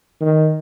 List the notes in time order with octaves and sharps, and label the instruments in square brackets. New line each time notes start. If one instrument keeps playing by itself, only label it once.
[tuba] D#3